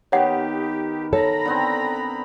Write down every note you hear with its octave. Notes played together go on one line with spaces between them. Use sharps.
D#3 B3 G4 C#5 F#5
A4 C#5 A#5 B5
D3 B3 C4